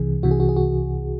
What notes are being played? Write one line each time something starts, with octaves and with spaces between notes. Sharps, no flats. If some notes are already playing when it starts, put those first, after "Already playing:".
Already playing: C2 C3 E3 G#4
C2 C3 E3 F#4
G#4
F#4
G#4
F#4